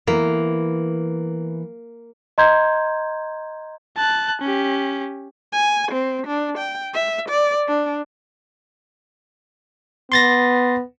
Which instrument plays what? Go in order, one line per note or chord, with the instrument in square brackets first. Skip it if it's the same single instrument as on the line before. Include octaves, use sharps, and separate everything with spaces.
[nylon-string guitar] E3 B3 E4 [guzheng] A#3
[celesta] D#5 A#5 C6 G6 G#6
[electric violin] A5 F#6
C#4 G4
[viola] G#5
C4
D4
G5
E5
D5
D4
[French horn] B3 [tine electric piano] C6 A6 A#6